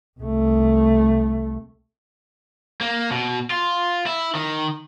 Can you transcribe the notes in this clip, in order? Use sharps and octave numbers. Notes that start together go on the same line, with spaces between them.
C2 A3
A#3
B2
F4
E4
D#3